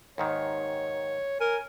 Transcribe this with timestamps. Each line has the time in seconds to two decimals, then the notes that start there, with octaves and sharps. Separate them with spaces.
0.18 D#2 G#2 D#3 C#5
1.40 A#4 G#5